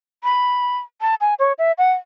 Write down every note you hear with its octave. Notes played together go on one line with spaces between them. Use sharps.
B5
A5
G#5
C#5
E5
F#5